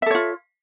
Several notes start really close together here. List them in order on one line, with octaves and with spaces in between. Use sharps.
E5 A4 C#5 F4